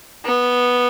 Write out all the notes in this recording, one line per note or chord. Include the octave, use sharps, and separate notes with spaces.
B3